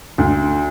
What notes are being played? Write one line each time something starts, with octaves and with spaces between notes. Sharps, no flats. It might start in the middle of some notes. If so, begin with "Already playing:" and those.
D2